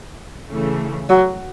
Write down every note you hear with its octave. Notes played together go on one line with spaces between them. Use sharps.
C#3 E3 A3
F#3